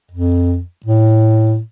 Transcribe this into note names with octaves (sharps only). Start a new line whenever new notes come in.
F2
A2